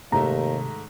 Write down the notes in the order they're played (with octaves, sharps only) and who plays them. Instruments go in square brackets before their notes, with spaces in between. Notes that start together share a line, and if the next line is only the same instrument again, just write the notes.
[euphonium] D#2 [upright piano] G#2 D#3 A3 [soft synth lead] C3 [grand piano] A#5